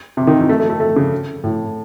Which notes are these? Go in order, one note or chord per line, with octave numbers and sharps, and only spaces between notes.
C3
D#3
E3
A3
A3
A3
A3
C#3
A2